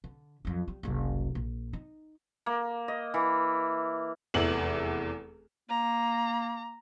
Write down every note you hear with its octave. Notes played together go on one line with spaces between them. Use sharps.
D3
F2 F#3
G3
F#1 C2
A#1
D#4
A#3
D#5
E3
F1 E2 E3 E4 F#7
A#3 A#5